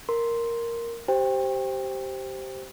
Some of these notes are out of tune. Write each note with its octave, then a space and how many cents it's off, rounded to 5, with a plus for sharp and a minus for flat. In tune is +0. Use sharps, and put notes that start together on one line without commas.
A#4 +0 C6 +0
G4 -15 C5 +0 G5 +20